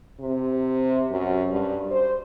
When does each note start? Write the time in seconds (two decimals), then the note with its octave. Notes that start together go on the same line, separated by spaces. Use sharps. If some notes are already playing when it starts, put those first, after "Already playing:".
0.20 C3
1.11 F#2
1.51 G2
1.90 C5